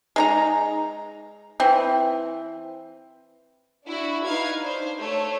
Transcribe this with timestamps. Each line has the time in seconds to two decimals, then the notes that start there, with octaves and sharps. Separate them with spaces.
0.16 G#3 D#4 A#5
1.60 E3 C4
3.86 D4 E4 F#4
4.25 D#4 B4 F5 G#6
4.60 D4 C5
4.99 A3 C#5